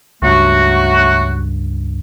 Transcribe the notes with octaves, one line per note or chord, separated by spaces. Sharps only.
C#2 G2 F#3 A3 F#4